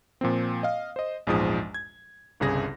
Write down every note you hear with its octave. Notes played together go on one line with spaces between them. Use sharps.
A#2 F3 A#3 C4
D#5 F5
C5 D#5
A#1 E2 G#2 F3 G#3 D#6
G#6
G1 C2 C#3 G#4 A#6